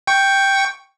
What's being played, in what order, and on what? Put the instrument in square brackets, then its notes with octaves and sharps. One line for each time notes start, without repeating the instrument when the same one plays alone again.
[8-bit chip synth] G5 C#6